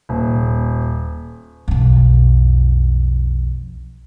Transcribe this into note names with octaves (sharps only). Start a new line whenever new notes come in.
D#1
B1 F2